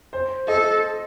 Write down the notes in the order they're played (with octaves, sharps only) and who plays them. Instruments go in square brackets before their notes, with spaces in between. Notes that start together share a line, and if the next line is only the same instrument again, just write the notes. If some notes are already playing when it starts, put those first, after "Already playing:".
[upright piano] C5
[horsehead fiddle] A4 [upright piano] D#5